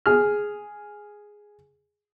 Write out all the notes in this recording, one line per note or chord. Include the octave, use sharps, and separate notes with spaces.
G#4 F6